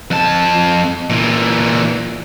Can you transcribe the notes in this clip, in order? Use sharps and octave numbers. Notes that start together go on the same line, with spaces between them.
F2 A5
A#2 E3